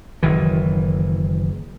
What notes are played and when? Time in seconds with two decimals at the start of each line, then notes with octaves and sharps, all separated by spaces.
0.23 F#1 D#3 E3